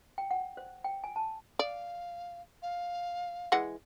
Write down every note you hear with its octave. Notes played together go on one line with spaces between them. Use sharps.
G5
F#5
C5
G5
G#5
A5
D5 F5
F5
E3 G#3 F#5